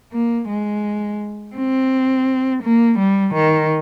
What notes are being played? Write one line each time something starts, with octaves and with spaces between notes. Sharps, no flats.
A#3
G#3
C4
A#3
G3
D#3